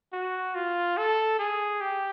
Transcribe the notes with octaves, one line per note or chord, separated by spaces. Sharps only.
F#4
F4
A4
G#4
G4